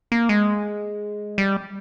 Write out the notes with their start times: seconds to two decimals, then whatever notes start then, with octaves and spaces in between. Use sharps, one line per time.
0.12 A#3
0.29 G#3
1.38 G3